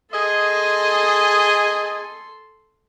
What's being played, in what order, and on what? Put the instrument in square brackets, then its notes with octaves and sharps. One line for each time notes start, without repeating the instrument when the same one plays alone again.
[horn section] G#4 D#5 [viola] A4 C6